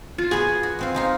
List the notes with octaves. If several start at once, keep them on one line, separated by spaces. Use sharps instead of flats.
F4
B3 F#4 G#4
F#4
G#3 C4 F4
G#3 D#4 F4